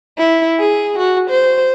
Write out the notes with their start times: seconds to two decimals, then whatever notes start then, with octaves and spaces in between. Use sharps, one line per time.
0.18 E4
0.59 G#4
0.98 F#4
1.30 C5